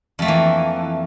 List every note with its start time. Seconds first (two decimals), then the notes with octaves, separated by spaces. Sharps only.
0.19 F2
0.22 A3
0.25 A#3
0.28 E3